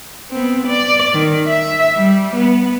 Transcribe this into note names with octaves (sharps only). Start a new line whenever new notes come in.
B3 C4
D5
D#3
E5
G3
B3